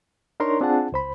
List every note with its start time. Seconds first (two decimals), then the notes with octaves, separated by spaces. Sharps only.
0.40 D4 D#4 A#4 C#5 A#5 C6
0.61 C4 D4 F4 G#4 F#5 A5
0.92 C#2 C5 B5